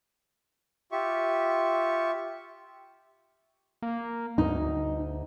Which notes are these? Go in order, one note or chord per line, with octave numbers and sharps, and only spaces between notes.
F4 G4 E5 C#6
A#3
D2 D#4